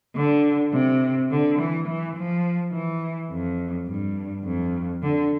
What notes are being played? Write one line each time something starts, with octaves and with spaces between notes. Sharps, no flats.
D3
C3
D3
E3
E3
F3
E3
F2
G2
F2
D3